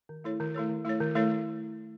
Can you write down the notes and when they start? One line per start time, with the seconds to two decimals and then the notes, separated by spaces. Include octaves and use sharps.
0.09 D#3
0.24 A3 E4 A4 C#5
0.40 D#3
0.54 A3 E4 A4 C#5
0.69 D#3
0.85 A3 E4 A4 C#5
1.00 D#3
1.15 A3 E4 A4 C#5